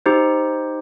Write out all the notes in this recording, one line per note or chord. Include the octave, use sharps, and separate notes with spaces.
D#4 G4 C5